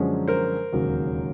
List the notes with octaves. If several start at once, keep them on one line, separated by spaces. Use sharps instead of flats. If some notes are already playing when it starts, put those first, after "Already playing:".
Already playing: F#2 D3 F3 G#3 C#4
A#4 C5
E1 D#2 C#3 F#3